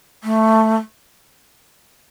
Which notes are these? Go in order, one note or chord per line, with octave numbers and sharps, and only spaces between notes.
A3